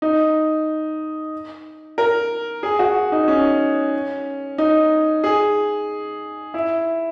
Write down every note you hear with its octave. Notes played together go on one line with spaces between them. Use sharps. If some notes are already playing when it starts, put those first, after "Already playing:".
D#4
A#4
G#4
F#4
D#4
C#4
D#4
G#4
E4